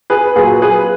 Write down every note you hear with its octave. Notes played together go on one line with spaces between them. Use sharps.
G#4 B4
A#2 F#3 G#4 B4
G#4 B4